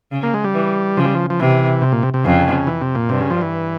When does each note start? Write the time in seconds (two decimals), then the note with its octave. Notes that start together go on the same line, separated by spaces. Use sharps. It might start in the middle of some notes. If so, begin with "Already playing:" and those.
0.12 C#3
0.23 A#3
0.34 G#3
0.44 G3
0.54 E3
0.97 C#3 F3
1.05 G3
1.15 F3
1.30 F3
1.40 C3 E3
1.81 C3
1.92 A#2
2.03 C3
2.14 C3
2.25 F2 C#3
2.67 E3
2.81 C3
2.95 A#2
3.09 G2 C3
3.21 C#3
3.30 F3
3.41 E3